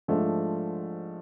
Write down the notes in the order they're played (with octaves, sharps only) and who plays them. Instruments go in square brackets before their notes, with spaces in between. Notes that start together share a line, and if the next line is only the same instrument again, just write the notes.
[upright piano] G#2 F3 A3 D4